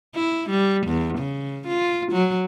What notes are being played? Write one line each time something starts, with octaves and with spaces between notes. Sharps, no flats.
E4
G3
E2
C#3
F4
F#3